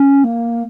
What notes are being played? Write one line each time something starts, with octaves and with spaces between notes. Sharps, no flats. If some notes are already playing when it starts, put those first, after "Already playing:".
Already playing: C#4
A#3